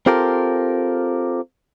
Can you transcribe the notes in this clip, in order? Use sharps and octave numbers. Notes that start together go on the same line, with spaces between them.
C4 F4 G4 A4 A#4